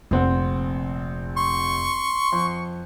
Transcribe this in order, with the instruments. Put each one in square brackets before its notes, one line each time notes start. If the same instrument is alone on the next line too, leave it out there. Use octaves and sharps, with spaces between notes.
[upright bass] F1 [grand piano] A#1 C4 F#5
[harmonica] C6 C#6
[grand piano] F2